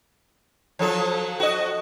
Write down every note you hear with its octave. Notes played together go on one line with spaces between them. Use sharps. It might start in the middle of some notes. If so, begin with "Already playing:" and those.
F3 F#3 A4
F#4 D#5